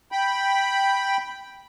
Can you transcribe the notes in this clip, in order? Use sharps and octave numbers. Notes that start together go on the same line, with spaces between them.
G5 B5